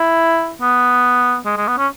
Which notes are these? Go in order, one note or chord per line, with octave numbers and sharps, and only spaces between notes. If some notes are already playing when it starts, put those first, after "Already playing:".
Already playing: E4
B3
G#3
G#3
B3
C#4